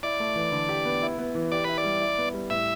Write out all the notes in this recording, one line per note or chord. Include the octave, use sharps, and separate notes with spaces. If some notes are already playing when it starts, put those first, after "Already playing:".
E4 D5
A3
E3
D3
G4
B3
E4
B3
E3
G4 D5
E4 B4
D5
G3
E4
B3
G3
A2 E5